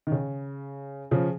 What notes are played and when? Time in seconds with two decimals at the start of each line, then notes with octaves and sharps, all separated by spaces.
0.07 D#3
0.12 C#3
1.11 C#3 F3